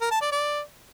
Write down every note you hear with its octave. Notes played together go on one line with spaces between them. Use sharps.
A#4
A5
D5
D5